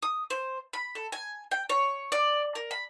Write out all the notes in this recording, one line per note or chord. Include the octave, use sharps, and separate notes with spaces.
D#6
C5
B5
A4
G#5
G5
C#5
D5
A#4
B5